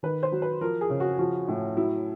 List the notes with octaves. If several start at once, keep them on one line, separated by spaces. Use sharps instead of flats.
D#3 B4
C5
F#3
B4
F3 A#4
G#4
C#3
F#4
F3 F#4
A2
F#3 E4